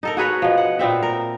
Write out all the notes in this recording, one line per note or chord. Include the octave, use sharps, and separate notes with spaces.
D#4 A4 A#4
F#4 G#4 B4 C#5
B2 F3
F#5
A#2 B3 C4 E5
A#4